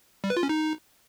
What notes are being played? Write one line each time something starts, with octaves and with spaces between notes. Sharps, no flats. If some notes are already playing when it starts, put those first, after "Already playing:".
G3
B4
F4
C#4
D#4